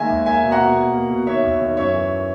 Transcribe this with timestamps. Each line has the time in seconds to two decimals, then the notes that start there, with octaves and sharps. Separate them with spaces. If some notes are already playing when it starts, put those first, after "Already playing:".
Already playing: D#3 G#3 A#3 E5 G#5
0.09 D#2
0.26 A#3 E5 G#5
0.43 B2
0.51 F#5 A#5
0.59 B2
0.76 A#3
0.93 A#3
1.10 B2
1.27 D#3 C#5 E5
1.44 D#2
1.60 D#3
1.77 F#2 C#5 E5
1.94 E3